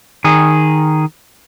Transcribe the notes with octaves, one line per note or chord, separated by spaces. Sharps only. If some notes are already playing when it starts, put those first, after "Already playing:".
D#3 G#4